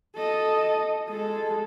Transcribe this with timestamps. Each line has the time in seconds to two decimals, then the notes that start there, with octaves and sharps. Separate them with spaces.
0.16 A4 D#5
1.09 G#3 A4